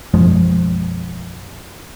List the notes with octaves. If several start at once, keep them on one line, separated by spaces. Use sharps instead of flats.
B1 F#2 F3 G#3